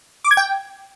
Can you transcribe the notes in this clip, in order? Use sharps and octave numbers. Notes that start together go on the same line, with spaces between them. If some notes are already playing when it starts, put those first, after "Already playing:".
D6
G#6
G5